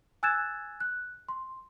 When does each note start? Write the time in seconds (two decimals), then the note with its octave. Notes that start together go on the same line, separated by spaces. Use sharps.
0.23 G#5 E6 F#6 G#6 A6 E7
0.80 F#6
1.29 C6